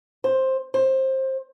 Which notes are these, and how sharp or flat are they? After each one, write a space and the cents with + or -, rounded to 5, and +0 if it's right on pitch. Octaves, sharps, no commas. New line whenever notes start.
C5 +10
C5 +20